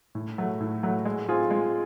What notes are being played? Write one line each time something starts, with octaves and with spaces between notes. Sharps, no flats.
A2
F#3 A3
A2
F#3 A3
G#3
C4 F4 G#4
G#3